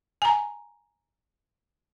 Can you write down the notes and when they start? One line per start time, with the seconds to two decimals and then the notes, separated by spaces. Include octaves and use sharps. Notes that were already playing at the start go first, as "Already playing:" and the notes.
0.22 G#5 A#5